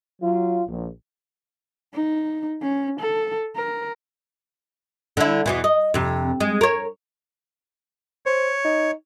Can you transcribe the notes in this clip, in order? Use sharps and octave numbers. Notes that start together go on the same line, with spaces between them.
F#3 F4
A#1
D#4
C#4
A4
A#4
D3 E4
E2 B2 E3
D#5
F2 C3
G#3
A#4 C#5
C5 C#5
D#4